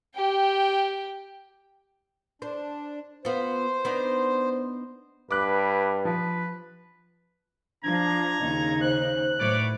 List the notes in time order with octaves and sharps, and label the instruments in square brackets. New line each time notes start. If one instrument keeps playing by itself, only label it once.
[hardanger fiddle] G4 G5
[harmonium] D4 [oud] C5
[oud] B3 F4 [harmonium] C5
[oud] B3 D4 D#4
[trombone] G2 [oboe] B4 [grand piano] D6 F#6
[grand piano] F3 [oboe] B4
[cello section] F3 [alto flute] D4 [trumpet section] A#5 [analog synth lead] G#6
[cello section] D#2 C#3 D#4
[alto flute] C5 [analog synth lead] F#6
[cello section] A2 F#3 B4 [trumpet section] C#5 D5 D6